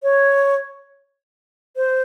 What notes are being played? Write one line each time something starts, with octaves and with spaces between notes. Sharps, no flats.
C#5
C5